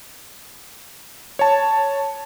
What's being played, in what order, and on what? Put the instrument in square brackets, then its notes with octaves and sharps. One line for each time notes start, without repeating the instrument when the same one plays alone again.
[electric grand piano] C#5 A5